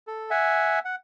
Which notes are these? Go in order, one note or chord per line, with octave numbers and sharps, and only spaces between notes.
A4
E5 F#5 G#5
F#5